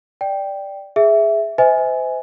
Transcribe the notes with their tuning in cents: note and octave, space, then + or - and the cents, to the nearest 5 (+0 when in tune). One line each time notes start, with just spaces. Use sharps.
D5 +0 G5 +0
G#4 +0 E5 +0
C5 -35 E5 -40 G#5 +0